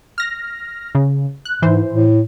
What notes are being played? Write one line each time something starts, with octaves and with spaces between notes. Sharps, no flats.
F6 A#6
C#3
F#6
G#2 E3 C5
A2